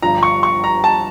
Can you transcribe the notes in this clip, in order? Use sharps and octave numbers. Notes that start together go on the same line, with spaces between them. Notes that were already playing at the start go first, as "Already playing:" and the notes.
G1 G2 F3 A#5
C#6
C#6
A#5
A5